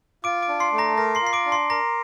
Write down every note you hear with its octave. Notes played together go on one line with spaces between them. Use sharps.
F4 D6 D7
D6 D7
D4
C6 C7
A3
A#5 A#6
A#4 A#5 A#6
C6 C7
F4
C7
D6 D7
D4
C6 C7
A#4 A#5 A#6